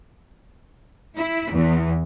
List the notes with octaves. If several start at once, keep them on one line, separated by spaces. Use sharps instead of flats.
E4
E2